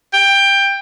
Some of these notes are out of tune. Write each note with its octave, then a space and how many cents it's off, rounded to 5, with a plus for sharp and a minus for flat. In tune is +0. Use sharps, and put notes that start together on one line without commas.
G5 +15